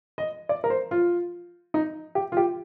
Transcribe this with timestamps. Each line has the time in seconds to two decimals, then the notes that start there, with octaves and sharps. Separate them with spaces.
0.18 D#5
0.49 D5
0.64 A#4
0.70 C5
0.91 F4
1.74 D#4
2.15 G4
2.32 F4
2.37 G4